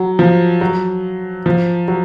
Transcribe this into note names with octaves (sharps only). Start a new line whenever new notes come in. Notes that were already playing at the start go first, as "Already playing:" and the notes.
Already playing: F#3
F3
F#3
F3
F#3